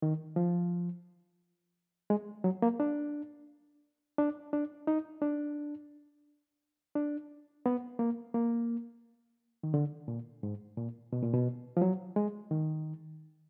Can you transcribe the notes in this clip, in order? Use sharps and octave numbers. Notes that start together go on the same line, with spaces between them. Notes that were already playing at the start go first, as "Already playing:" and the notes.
D#3
F3
G#3
F#3
A#3
D4
D4
D4
D#4
D4
D4
B3
A#3
A#3
D#3
D3
A#2
G#2
A#2
B2
A#2
B2
F3
F#3
G#3
D#3